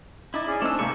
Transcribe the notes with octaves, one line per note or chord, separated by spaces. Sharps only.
D#4 E4 D6 A6
C#4 G#4 D5
A3 C4 D4 D#4 E6
G#2 C3 A#3 C#6